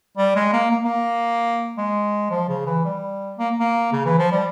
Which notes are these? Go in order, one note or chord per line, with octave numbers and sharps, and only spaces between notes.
G3
G#3
A#3
A#3
A#3
G#3
F3
C#3
E3
G3
A#3
A#3
C#3
E3
F3
G3